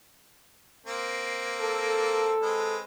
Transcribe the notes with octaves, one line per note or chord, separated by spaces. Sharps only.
A#3 C4
A4
G#3 C4 B4